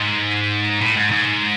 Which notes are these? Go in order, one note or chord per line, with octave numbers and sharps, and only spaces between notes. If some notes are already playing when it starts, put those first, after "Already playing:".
Already playing: G#2
A2
G#2
G#2